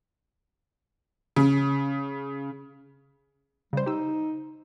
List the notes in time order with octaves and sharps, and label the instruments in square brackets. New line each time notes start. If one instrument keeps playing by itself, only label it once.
[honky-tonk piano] C#3
[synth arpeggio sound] C#3 C5 [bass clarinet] G3
[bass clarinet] D#4 [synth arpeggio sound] G4 E6